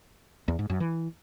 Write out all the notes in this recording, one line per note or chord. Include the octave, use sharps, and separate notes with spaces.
E2
G#2
F#2
E3